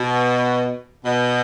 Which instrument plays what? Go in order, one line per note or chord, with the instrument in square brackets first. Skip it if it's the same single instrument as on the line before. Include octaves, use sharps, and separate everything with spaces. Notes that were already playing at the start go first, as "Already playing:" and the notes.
Already playing: [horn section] B2
B2